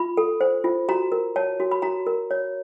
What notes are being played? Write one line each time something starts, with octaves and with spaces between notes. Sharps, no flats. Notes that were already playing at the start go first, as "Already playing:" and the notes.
Already playing: F4 B5
A4
C5
F4
F#4 A#5
A#4
C#5 A5
F#4
B5
F#4 A#5
A#4
C#5